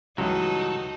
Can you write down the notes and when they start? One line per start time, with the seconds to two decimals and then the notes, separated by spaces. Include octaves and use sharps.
0.18 C#2 G2 E3 F#3 D#4 F#4 A4 D#5